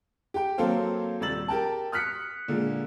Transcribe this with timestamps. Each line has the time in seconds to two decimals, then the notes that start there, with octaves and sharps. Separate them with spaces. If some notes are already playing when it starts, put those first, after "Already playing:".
0.34 G4 G5
0.58 F#3 A#3 C4 A4 C5 F5
1.20 D#1 C3 G3 E6 A6 F#7
1.48 G4 A#4 G5 A5
1.92 D#6 F6 F#6 B6 C#7
2.48 A#2 D3 G#3